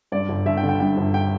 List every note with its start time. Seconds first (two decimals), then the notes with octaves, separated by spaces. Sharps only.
0.12 G2 D5
0.29 G1
0.46 G1 E5
0.57 G5
0.63 D3
0.69 G5
0.80 G2 G5
0.97 G1
1.14 G5